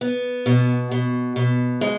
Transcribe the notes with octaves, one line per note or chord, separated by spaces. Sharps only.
B3
B2
B2
B2
G#3